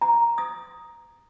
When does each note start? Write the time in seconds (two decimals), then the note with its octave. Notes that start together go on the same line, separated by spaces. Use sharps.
0.01 A#5
0.38 D#6